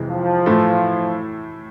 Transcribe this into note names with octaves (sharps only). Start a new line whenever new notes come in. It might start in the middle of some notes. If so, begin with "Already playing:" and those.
Already playing: F2 C3 E3 G#3
F3
A2 E3 A3 E4